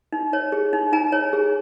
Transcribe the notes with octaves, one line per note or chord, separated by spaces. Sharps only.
D#4
C#5
G#4
D#4
D#4 G#5 A#5
C#5
G#4